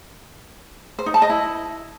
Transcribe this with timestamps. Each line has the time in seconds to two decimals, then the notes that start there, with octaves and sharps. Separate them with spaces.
0.99 C5
1.06 D#4
1.14 A5
1.22 D#5
1.30 E4